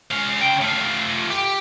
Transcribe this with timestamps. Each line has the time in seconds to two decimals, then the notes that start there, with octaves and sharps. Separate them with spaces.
0.11 G#3 F5
0.41 C#3 G5
0.62 A3 F4
1.30 G4